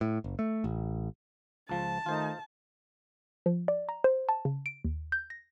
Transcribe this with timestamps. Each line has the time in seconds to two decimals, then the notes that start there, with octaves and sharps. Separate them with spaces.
0.01 A2
0.24 F#1
0.39 A3
0.64 A1
1.69 C#2 F3 A5
2.06 D#3 A3 D#4 F4 C5
3.46 F3
3.68 D5
3.89 A#5
4.04 C5
4.29 A5
4.45 C#3
4.66 D7
4.85 D#2
5.12 G6
5.30 A#6